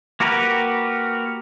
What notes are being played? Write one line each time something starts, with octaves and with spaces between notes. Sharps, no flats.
A#3 F#4 G4 A#4 B4